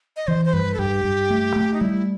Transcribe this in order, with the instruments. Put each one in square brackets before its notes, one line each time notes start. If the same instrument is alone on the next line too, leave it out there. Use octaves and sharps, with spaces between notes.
[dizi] D#5
[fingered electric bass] E3 [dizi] C5
[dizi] C5
[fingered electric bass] G2 [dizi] B4
[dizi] A4
[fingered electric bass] G2 [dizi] G4
[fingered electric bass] G2
A3
A3
[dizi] D#4
[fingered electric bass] G3 [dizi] E4